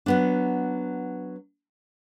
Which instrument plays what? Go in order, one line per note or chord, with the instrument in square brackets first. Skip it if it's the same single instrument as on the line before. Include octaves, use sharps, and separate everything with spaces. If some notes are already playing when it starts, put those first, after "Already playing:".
[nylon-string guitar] F#3 B3 D4